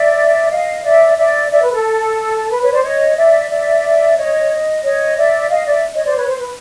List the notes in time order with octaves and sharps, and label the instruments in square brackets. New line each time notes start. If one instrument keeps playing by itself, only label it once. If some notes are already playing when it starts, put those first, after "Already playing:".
Already playing: [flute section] D5 E5
D#5 F5
D5 E5
D5 E5
D5 E5
B4
A4
B4
B4 C#5
C5 D5
C#5 D#5
D5 E5
D5 E5
C#5 D#5
C#5 D#5
D5 E5
D#5 F5
D5 E5
C#5 D#5
C5 D5
B4 C#5
C5
B4